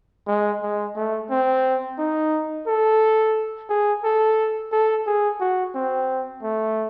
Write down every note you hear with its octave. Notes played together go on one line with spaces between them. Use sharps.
G#3
G#3
A3
C4
D#4
A4
G#4
A4
A4
G#4
F#4
C4
A3